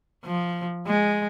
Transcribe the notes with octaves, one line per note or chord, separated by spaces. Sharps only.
F3
G#3